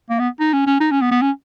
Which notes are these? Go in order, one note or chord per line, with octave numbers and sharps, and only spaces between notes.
A#3
B3
D#4
C#4
C#4
D#4
C#4
B3
B3
C#4